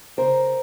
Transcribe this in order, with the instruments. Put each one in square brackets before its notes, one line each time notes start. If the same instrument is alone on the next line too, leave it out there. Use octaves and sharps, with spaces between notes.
[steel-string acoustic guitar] C#3 A#4 C5